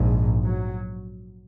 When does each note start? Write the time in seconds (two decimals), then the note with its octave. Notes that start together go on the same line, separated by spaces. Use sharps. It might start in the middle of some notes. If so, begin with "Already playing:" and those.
Already playing: A#1 G#2
0.44 F#3